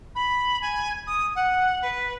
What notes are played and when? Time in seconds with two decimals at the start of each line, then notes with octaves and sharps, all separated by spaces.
0.15 B5
0.61 G#5
1.07 D#6
1.35 F#5
1.82 B4